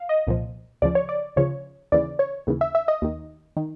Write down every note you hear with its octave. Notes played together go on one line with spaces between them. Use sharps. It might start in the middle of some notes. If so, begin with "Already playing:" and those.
Already playing: F5
D#5
C2 A#2 F3
D2 C#3 F3 D5
C#5
D5
D2 C#3 F3 C#5
D#2 C#3 E3 D5
C#5
D#2 C#3 E3
E5
E5
D#5
D#2 D#3
D#3